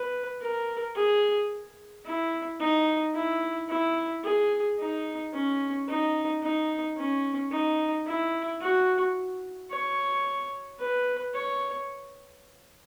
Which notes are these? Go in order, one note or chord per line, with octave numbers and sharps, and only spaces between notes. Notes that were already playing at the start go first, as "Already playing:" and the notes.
Already playing: B4
A#4
G#4
E4
D#4
E4
E4
G#4
D#4
C#4
D#4
D#4
C#4
D#4
E4
F#4
C#5
B4
C#5